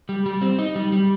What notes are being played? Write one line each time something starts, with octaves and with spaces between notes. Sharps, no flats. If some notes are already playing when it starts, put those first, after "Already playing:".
G3
G3
C4
D#4
G3
G3